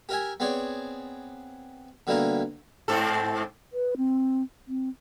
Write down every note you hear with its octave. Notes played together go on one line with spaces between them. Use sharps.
G4 A#4 E5 G#5
B3 C4 G#4 C#5 D5
B2 D3 G3 A#3 E4 A#4
G#2 C4 A4
B4
C4
C4